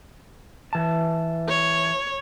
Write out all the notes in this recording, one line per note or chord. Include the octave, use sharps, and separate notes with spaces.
E3 A5
C#5